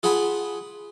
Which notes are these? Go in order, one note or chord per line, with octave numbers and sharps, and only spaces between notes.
F4 G#4 F#5 A5 B5